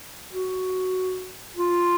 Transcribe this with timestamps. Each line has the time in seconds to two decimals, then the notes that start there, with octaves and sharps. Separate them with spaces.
0.33 F#4
1.56 F4